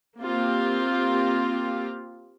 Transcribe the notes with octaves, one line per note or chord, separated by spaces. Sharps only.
A#3 C4 F4 G4